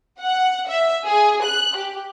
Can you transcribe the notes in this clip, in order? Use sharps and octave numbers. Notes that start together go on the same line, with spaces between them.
F#5
E5
G#4
F#6
G4